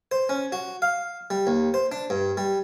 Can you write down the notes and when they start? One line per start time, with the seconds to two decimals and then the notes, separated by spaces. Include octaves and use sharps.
0.11 C5
0.29 C#4
0.52 F#4
0.82 F5
1.30 G3
1.47 D#2
1.74 C5
1.92 D4
2.10 G2
2.37 G3